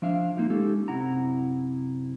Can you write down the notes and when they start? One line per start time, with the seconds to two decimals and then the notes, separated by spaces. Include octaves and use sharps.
0.02 F3 D4 E5 F5
0.37 A#3 D#4 F4
0.50 G#3 C#4 D#4 G4 A4
0.88 F#2 C3 E4 F#5 A#5